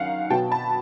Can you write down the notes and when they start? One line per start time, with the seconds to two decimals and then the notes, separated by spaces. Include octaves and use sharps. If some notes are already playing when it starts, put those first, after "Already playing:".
Already playing: F#2 D#3 F5 F#5
0.30 B2 F#3 B3 G5 A5
0.51 A5 B5